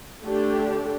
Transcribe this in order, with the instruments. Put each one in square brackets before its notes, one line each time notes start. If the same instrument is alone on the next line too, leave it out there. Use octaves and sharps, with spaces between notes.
[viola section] D3 A3 D4 G4